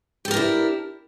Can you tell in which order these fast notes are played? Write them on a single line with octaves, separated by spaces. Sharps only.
G4 A4 A#4 D4 E4